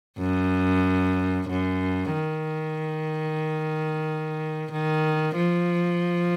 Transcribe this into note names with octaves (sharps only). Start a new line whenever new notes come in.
F#2
F#2
D#3
D#3
F3